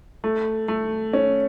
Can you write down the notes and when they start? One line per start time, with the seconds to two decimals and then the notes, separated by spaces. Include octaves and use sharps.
0.24 A3
0.68 A3
1.13 C#4